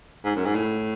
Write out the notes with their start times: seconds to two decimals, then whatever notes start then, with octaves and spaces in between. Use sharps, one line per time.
0.25 G#2
0.36 F#2
0.45 G#2
0.55 A2